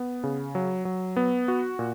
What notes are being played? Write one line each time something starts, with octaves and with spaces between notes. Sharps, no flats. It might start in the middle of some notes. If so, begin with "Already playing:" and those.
Already playing: B3
C#3
F#3
F#3
B3
F#4
A#2